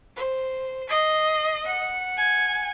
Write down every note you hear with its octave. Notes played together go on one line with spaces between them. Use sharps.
C5
D#5 C7
F#5 C#7
G#5